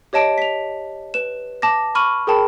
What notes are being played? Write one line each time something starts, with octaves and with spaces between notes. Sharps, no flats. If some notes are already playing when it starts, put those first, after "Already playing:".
G4 C#5 D#5 A5 D7
B6 F7
B4 E7
A5 D6 A#6
B5 C#6 F6 D#7 F#7
G#4 A#4 G5 A5 B5